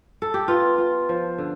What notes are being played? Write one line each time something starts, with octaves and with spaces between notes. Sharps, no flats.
A4
G4
B3 F4
F4
F3
D3